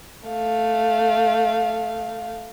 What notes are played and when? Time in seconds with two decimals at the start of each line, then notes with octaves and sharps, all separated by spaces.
0.27 A3 F5